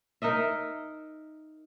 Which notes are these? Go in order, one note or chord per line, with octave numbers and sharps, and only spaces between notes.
D#4 A#4 D#5 E5